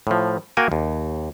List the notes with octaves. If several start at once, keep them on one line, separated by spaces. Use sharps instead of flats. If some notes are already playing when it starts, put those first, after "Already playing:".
A2 F3
A#3 F#4 A#4 G5 G#5
D#2